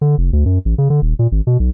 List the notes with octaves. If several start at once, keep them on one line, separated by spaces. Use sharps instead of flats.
D3
F1
D2
F#2
A1
C#3
D3
D#1
A#2
G#1
B2
B1